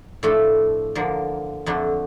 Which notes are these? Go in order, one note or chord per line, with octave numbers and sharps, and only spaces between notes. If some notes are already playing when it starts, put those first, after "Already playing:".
A2 F3 A3 D4 A4
D3 F3 A#3
F2 D3 A3 D4